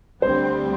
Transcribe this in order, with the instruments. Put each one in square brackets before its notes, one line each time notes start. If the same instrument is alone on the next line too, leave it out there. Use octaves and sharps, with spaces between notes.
[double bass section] D2 D3 G3 C4 [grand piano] C5